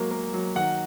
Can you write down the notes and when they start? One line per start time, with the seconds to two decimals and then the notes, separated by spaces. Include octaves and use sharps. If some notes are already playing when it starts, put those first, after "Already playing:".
Already playing: F#3 G#3 A#3
0.11 A#3
0.33 F#3
0.55 D#3 F#5